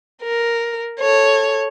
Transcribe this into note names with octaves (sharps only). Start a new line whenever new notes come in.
A#4
A4 C#5